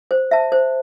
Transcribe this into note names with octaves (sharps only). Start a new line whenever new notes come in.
C5
E5 A5
C5